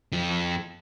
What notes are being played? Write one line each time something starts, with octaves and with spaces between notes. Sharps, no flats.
F2 F3